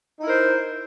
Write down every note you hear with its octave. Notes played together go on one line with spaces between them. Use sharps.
D#4 E4 A#4 C5